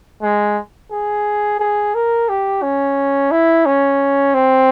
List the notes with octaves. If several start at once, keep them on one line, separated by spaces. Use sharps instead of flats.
G#3
G#4
G#4
A#4
G4
C#4
E4
C#4
C4